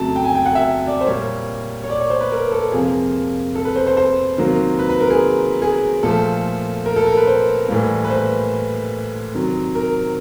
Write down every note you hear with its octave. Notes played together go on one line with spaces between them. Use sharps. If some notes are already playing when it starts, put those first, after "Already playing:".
Already playing: F2 C#3 F#3 A3 A5
G5
G#5
G5
F#5
E5
D5
C5
A#2 G3 A#3 C#5
C#5
D5
C#5
C5
B4
A#4
A4
F2 C3 F3 A#3 G#4
A4
B4
C5
C5
C5
C3 D#3 F#3 A#3
B4
B4
A#4
G#4
G#4
A#2 F3 A3 A4
A#4
A4
A#4
B4
C5
A2 E3 G3 A#3
B4
C5
C3 D#3 F#3
A#4